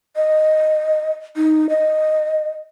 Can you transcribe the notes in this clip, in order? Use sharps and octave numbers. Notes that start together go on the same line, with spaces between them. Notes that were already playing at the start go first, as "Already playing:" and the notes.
D#5
D#4
D#5